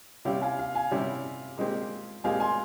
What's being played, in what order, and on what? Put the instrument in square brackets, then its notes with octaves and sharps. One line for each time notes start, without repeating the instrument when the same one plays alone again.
[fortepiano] C3 G3 C#4 E4 G4 [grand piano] F5
[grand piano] F5 G#5
F5
F5 G#5
[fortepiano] C3 G3 C#4 E4 G4
A#2 G#3 C4 G4
[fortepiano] A#2 G#3 C4 G4 [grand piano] F5 G#5
[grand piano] G#5 C6